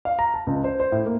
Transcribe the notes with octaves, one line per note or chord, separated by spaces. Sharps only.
F5
A#5
A5
C#2
C5
C5
A2
A#3